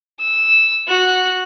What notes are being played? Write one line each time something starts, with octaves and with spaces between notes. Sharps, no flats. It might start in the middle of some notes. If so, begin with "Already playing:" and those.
E6
F#4 F#6